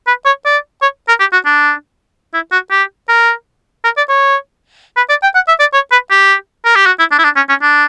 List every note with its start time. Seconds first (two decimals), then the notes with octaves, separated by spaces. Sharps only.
0.07 B4
0.26 C#5
0.45 D5
0.82 C#5
1.08 A#4
1.20 G4
1.33 F#4
1.46 D4
2.34 E4
2.52 F#4
2.71 G4
3.09 A#4
3.84 A#4
3.97 D5
4.09 C#5
4.97 B4
5.09 D5
5.23 G5
5.35 F#5
5.48 E5
5.60 D5
5.73 C#5
5.92 B4
6.11 G4
6.65 A#4
6.76 G4
6.86 F#4
6.99 E4
7.11 D4
7.19 E4
7.24 D4
7.36 C#4
7.49 C#4
7.62 D4